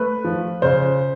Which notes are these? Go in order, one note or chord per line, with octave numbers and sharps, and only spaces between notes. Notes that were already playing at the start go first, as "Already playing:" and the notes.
Already playing: A3 B4
F3
C#3 C5